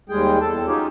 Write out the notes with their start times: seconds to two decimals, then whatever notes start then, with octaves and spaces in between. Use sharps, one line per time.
0.09 D#2 G3 G#3 G#4 G5
0.41 E2 A4 A5
0.67 F#3 C#4 D#4 F4 G4 G#4